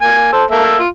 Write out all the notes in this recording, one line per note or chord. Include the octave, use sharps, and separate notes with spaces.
A#3 G#5
A4 C5
A#3 A4 E5
F4